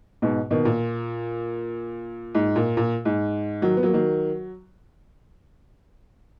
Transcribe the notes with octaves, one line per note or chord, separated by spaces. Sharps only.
G#2 B2
B2 D#3
A#2
G#2
A#2
A#2
G#2
D#3 F#3
B3
F#3 A#3
D#3 F#3